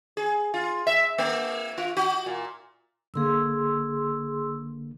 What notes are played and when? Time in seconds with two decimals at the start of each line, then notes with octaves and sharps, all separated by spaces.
0.17 G#4
0.54 F4
0.87 E5
1.18 A#3
1.78 F4
1.97 F#4
2.26 A#2
3.14 G1 D3 A#3 G#4 C6 E6